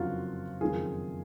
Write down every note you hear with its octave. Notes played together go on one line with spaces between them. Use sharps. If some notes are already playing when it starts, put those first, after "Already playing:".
Already playing: F#1 F2 D3 F#3 F4 F#4
F#1 F2 D#3 G#3 F4 G#4